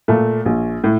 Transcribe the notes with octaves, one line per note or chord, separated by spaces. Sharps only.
A#2 A3
A#1
A2